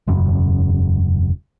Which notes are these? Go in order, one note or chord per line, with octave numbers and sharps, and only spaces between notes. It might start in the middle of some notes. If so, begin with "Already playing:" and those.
E1 F#2 C#3